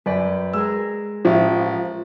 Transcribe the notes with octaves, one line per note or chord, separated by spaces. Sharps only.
F#2 B4 D5 G5
G#3 G#4 A#4 E6
A1 F3